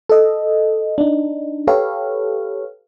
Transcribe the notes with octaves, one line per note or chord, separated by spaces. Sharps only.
A4 D#5
D4 D#4
G4 A4 B4 C#5 F5